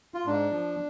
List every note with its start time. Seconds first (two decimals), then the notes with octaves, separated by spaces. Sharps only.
0.14 F4
0.25 G#2 D4
0.51 F3